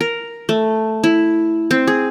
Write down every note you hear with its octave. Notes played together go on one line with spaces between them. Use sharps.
A#4
A3
E4
C4
G#4